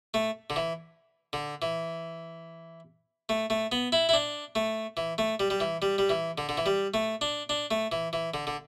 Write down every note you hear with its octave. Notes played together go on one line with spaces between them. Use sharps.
A3
D3
E3
D3
E3
A3
A3
B3
E4
E4
D4
A3
E3
A3
G3
G3
E3
G3
G3
E3
D3
D3
E3
G3
A3
D4
D4
A3
E3
E3
D3
D3